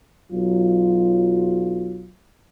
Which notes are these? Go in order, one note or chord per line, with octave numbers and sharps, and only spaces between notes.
B1 F#3 F4